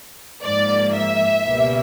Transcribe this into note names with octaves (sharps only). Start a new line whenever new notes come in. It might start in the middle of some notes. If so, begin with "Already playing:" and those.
G#2 F3 A#3 D5
E5
C#2 B2 G3 A#3